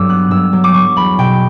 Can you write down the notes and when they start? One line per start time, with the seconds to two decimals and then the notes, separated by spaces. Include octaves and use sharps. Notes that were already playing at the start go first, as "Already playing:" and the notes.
Already playing: G2 F#3 D6 E6
0.09 B3 F#6
0.31 G2 E6
0.53 F#3 D6
0.64 D6
0.74 F#3 C#6
0.96 E2 B5
1.18 B2 G5